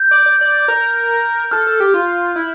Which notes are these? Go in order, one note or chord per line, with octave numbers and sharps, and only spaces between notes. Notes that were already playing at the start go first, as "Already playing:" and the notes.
Already playing: G6
D5
D5
D5
A#4
A4 F6
A4
G4
F4
E4